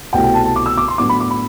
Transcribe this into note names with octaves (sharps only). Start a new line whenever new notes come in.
C2 B2 A3 C4 G5
G5
A5
A5
D6
E6
D6
C6
A2 F#3 B3 D4 D6
B5
D6
B5